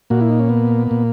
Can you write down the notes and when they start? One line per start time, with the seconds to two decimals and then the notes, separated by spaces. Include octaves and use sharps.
0.10 A#2 A#3 F#4
0.21 E4
0.30 D#4
0.39 C#4
0.49 B3
0.87 A#2 A#3